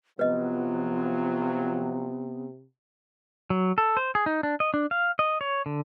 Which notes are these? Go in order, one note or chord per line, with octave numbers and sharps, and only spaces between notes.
C3 F3 F#3 B3 F4 B4 D#5
F#3
A4
C5
G#4
D#4
D4
D#5
D4
F5
D#5
C#5
D3